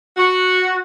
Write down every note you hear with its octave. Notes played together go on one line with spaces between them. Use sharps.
F#4